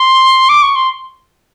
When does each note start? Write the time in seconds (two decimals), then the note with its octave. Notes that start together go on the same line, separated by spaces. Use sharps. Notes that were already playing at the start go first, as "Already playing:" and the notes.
Already playing: C6
0.49 D6
0.62 C#6
0.76 C6